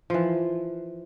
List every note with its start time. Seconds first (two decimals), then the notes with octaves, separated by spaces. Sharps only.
0.10 E3 F3